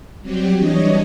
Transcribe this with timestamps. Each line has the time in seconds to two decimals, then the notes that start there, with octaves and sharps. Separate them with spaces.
0.22 F#3 G3 C4 G4
0.58 E3 G3 D4 C#5 D#5